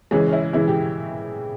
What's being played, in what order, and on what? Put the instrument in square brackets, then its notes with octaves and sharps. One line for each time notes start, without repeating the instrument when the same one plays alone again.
[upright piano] C#3 E3 G#3 C#4
C#4
E4
C#3 E3 G#3 E4
G4